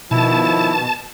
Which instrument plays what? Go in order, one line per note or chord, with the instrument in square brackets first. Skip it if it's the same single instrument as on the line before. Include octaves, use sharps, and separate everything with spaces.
[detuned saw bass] B2 [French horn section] D#3 F3 [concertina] E4 [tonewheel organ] A5